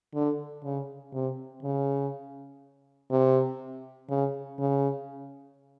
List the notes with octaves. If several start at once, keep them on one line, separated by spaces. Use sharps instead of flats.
D3
C#3
C3
C#3
C3
C#3
C#3